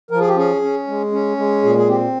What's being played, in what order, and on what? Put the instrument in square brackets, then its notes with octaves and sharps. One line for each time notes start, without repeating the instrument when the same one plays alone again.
[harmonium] F3 A#4
G#4
G4
C#4 G#4
C#4
G#3
C#4
G#3
A#2 G#4
G#4
C4 G4